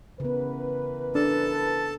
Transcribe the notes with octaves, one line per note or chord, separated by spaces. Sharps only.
C#3 E3 B3 A#4 B4
D4 A4 A5